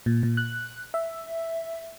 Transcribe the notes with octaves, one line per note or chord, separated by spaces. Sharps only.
A#2
A#2
F#6
E5